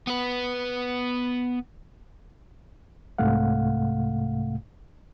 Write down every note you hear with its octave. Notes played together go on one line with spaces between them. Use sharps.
B3 B4
C2 G#2 C3 A3 F5 F#5